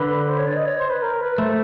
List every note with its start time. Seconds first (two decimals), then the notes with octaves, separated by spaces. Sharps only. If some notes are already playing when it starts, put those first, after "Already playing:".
Already playing: D3 B4
0.28 C5
0.38 C#5
0.46 D5
0.56 D#5
0.65 C#5
0.78 C5
0.89 B4
1.02 A#4
1.21 B4
1.38 A3 C5